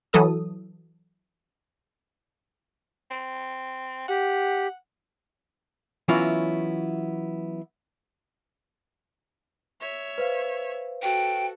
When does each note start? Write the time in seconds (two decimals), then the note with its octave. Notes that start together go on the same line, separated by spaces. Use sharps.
0.13 E3 F#3 A4 D#6
3.11 C4
4.08 G4 F#5
6.08 E3 F#3 B3 C#4 E4 F4
9.80 C#5 E5
10.18 B4 C5 F5
11.02 F#4 A4 G5